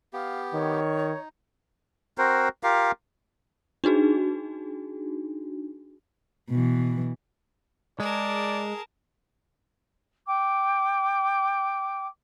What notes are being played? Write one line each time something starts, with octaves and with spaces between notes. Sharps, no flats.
B3 G4 F5
D#3 C#5
D#4
C4 F#4 A#4 C5
F4 G4 A#4 F5
D4 D#4 F#4 G#4
B2 E3
G#3 G#4 A#4 D5 A5
G5 D6